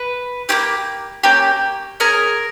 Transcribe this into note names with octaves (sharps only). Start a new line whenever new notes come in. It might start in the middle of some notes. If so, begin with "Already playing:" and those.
Already playing: B4
A#3 C#4 G4
A#3 C#4 G4
C#4 G#4 A#4